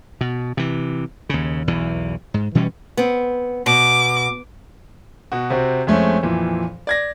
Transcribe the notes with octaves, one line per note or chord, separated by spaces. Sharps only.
B2
C3 E3
D#2 C#3
B1 E2 E3
G#2
B2 E3 G3 C#4
B3 C4
B2 D6
B2 F#4
C3 C4 F#4
F2 G#3 A3 C4 C#4
F2 A#2 E3
D5 G#6 A#6